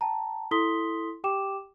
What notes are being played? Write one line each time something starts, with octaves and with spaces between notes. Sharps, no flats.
G5 A5 A#5
E4 A4 C6 D#6 B6 G7
G4 G5 D6 E7